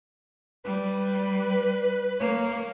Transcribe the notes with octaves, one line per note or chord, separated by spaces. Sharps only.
G3 B4
A#3 C#5